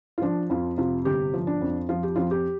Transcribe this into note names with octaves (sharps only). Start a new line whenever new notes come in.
F4
F3 D4
F2 F4
C3 F4
G1 G4
F3
D4
F2
F3 F4
G4
F2 F4
G4